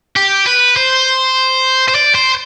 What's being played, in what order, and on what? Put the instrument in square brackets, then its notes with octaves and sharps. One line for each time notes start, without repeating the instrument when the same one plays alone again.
[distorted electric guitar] G4
B4
C5
C5
D5
C5